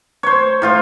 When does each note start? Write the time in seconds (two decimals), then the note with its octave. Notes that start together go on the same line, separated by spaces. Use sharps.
0.23 C5 C#5
0.62 A2 F4 C5